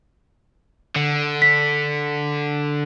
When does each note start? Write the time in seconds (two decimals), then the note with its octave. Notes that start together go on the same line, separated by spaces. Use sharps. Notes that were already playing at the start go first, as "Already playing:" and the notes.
0.96 D3
1.42 B6